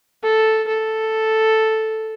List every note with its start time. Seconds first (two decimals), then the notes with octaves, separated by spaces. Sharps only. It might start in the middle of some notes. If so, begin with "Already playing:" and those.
0.23 A4
0.68 A4